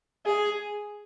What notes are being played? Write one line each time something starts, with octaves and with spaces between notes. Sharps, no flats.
G#4